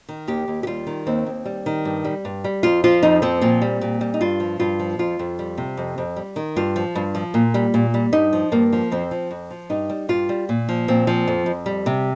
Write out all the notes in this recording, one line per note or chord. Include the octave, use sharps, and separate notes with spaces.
D#3
D#2 G4
D#2
G4
G3 F4
D#3
D#2 C4
D#2
G3
D#3
G2
G3
G2
G3
F2 F4
F3 F4
F2 D#4
F3 C4
A#2 C4
G3
A#2
G3
D#4
G2 F4
F3
G2 F4
F3
F2 F4
F2
G3
C3
F2
F2
G3
D#3
G2 F4
F3
G2
F3
A#2
G3
A#2
G3
G2 D#4
F3
G2 A#3
F3
F2 C4
F3
F2
F3
G2 D#4
G3
G2 F4
G3
A#2
F3
A#2 C4
F3
F2
F2
G3
C3